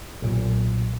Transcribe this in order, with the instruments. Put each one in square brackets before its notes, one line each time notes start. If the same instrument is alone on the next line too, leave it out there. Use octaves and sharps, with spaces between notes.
[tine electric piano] B1 A#2